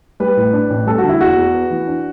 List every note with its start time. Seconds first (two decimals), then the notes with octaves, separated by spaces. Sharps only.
0.20 G3 B4
0.37 A2
0.53 D4
0.70 A1
0.87 G3 A4
0.98 F#4
1.04 D3
1.09 E4
1.20 E2 F#4
1.36 E2
1.54 B3
1.70 E3
1.87 D4